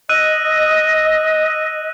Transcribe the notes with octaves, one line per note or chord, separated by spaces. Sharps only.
D#5 E6 F#6 D#7